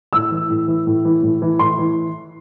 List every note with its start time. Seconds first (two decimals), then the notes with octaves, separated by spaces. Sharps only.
0.13 A2 E6
0.31 E3
0.50 A2
0.68 E3
0.87 A2
1.05 E3
1.23 A2
1.42 E3
1.59 A2 C6
1.79 E3